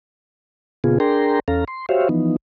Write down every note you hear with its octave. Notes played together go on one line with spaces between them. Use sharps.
A#2 C#3 B3 F4 G#4
D4 G#4 A#4 G5 A#5 C6
E2 C#4 A4 F5 A#5
C6
F#4 G4 C5 C#5 E5 F5
E3 F3 B3 D#4